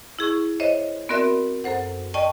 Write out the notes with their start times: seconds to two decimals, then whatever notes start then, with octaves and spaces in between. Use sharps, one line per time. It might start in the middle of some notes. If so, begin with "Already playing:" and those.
0.19 E4 G#4 C#6
0.60 C5 C#5 D#5 E5
1.09 B3 C4 F#4 A#4 D5 E5
1.64 F#2 A4 C5 F#5
2.14 D5 D#5 G5 A5 C#6